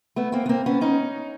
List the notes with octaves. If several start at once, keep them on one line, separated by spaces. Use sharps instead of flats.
A3 B3
A#3 C4
B3
A#3 C4
B3 C#4
C#4 D#4